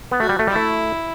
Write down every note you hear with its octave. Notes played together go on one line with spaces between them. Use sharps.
B3
A3 F#4
G3
A3
G3 E4
A3